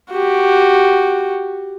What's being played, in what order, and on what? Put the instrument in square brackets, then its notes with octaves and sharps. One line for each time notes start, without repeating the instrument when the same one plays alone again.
[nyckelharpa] F#4 G4